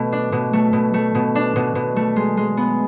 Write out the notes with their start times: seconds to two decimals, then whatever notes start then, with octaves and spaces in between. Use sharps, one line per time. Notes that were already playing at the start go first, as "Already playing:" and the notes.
Already playing: B2 A3
0.12 D4
0.32 B2
0.53 A3
0.73 B2
0.94 A3
1.15 B2
1.35 D4
1.56 B2
1.75 B2
1.96 A3
2.16 G#3
2.37 G#3
2.57 B3